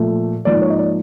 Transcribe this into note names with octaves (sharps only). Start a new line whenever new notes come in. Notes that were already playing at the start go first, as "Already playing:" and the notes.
Already playing: A#2 F3 A3
G#2 F3 A#3 D5
C#5
D#5
D5